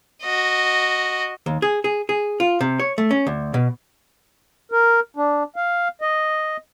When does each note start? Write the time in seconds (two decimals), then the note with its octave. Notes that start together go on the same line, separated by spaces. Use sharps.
0.23 F#4 D#5
1.46 D#2
1.62 G#4
1.84 G#4
2.09 G#4
2.40 F4
2.61 C3
2.80 C#5
2.98 A3
3.11 C#4
3.27 D2
3.54 B2
4.72 A#4
5.17 D4
5.56 F5
6.01 D#5